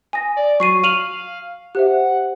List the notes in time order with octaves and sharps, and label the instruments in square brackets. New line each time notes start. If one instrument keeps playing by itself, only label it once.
[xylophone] G#5 D#6 A#6
[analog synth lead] D5
[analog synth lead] F#3 [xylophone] C#6 C7 D#7
[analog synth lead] F5 [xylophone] D#7 F7 F#7
[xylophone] G4 C5 E5 [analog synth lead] F#5